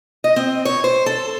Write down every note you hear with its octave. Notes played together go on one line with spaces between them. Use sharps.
D#5
C4
C#5
C5
A4